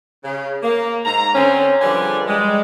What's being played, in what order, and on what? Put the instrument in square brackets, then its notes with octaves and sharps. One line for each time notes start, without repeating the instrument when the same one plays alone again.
[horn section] C#3
A#3
G#2 A#5
D3 C4 C#4
D3 F3 G3 G#4 B4 G#5
G3 G#3